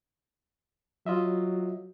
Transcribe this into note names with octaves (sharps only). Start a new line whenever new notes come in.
F#3 F4 D#5 E5